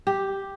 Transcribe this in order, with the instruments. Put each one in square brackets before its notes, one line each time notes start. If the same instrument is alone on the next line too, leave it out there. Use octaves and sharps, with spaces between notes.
[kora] G4